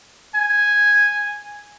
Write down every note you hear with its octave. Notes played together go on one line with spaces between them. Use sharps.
G#5